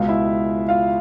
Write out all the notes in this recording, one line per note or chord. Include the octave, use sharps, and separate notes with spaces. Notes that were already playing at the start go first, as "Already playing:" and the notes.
Already playing: C#2 B2 G#3 F4 F5
E4 E5
F4 F5